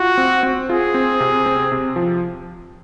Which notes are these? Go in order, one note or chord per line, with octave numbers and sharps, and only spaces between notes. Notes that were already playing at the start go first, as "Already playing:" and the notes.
Already playing: F4 F#4
C4
C4
F4 G#4
C4
C3
C4
C3
F3